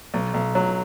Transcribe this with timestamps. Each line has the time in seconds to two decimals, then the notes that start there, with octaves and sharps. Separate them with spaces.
0.14 B1
0.34 B1
0.55 F#3